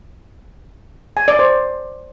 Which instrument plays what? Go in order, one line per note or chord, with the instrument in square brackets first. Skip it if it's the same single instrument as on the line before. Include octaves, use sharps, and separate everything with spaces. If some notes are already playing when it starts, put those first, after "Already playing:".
[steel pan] G#5
D5
C5